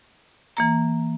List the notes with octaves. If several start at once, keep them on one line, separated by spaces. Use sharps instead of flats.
E3 A#3 A#5